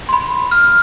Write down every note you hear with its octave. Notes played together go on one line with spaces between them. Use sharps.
B5 C6
F6